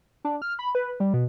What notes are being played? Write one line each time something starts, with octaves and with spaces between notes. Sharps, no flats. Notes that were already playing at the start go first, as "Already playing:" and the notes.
D4
F6
B5
B4
G3
B2